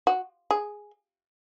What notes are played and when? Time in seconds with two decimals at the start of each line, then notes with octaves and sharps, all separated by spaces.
0.07 F#4
0.51 G#4